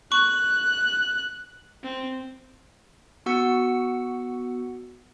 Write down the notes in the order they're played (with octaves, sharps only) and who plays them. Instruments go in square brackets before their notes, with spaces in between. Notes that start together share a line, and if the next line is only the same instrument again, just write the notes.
[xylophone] C#6 [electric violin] F#6
[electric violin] C4
[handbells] B3 F#4 F#5 E6 C#7